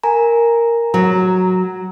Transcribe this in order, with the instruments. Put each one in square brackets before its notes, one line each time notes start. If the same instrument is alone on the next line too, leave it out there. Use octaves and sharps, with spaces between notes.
[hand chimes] A#4 G#5 A#5
[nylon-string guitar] F#3 [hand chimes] A#5